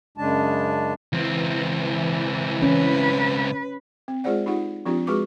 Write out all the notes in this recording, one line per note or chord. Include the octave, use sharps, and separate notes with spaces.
F#2 C#3 G#3 D4 A5
C#2 E3 C4
C#4 B4
C4
G#3 F4 G#4 C5 D5 F#5
D#4 F4 G4 F#5
F3 C4 D4 F4 G4
G#3 F#4 G#4 B4 C#6 D6